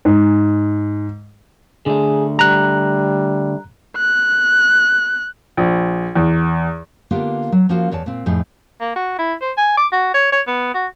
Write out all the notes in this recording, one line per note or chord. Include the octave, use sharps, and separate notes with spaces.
G#2
D3 A3 G#4
G3 A#5 F#6
F#6
A#1
E2
D3 A#3 B3 D4 F4 G4
F#3
F3 A#3 C#4 F4 F#4
E2 C#5 D5 A5
A#2 C4
F2 A2 D#4 G#4
A#3
F#4
E4
C5
G#5
D6
F#4
C#5
C#5
B3
F#4